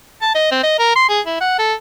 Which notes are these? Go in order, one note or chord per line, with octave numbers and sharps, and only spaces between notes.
A5
D#5
C4
D#5
A#4
C6
G#4
E4
F#5
A4